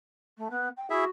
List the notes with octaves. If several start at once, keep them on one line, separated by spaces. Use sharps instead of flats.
A3
B3
G5
E4 F#4 G#4 E5